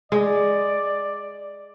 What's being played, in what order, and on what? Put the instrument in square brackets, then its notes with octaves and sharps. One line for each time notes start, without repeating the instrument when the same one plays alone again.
[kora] G#3 [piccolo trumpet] D5